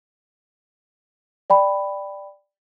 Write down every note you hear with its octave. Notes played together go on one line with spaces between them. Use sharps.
D5 G5 B5